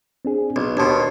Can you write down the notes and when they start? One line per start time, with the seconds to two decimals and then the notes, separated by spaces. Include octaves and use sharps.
0.25 C4 D4 G#4
0.56 B1 B3
0.77 D#2 B2 D4 A5 C6